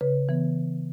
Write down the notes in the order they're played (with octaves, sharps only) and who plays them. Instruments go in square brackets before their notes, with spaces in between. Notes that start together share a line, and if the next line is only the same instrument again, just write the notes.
[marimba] C#3 B4
E3 B3